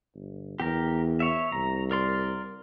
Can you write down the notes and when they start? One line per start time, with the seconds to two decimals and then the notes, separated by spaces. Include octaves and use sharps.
0.15 G1
0.60 E2 G4 A#4
1.20 C#5 E5
1.52 C2 A#5
1.91 A#4 D5 C6